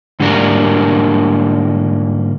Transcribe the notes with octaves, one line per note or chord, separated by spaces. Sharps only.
G#2 D3 G3 A#3 D4 A#4